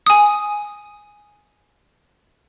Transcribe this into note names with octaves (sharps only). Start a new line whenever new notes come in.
G#5 D#6